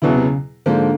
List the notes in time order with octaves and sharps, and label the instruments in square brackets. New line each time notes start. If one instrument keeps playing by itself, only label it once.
[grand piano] E2 B2 F#3 B3 E4 [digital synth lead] D3
[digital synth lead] C#3
C3
C#3
[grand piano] G#2 F3 A#3 [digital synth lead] D3